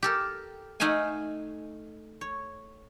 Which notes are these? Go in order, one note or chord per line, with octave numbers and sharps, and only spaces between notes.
G4 A4 A#4
A3 D#4 F5 F#5 G#5
C#5